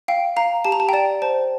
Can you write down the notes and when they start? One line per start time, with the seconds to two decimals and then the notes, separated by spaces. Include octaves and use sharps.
0.08 F5 G5
0.37 F5 A#5
0.65 G4 A5
0.72 A#5
0.80 A5
0.89 G5
0.93 D5 A5
1.22 C5 A5